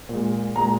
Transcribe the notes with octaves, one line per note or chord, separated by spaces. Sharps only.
A#2 G#3
A#2 G#3 A#5